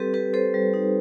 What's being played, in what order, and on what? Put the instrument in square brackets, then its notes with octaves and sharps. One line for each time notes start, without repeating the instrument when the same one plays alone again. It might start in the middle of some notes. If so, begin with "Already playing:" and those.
Already playing: [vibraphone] G3 C4 G4 A4 B4
C4 G4 B4
C4 A4 C5
G3
D#4